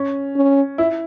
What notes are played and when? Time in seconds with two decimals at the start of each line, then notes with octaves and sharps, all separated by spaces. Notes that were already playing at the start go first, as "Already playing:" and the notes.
Already playing: C#4
0.36 C#4
0.78 E4